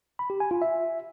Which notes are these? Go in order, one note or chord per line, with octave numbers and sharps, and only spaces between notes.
B5
G4
G#5
F4
E5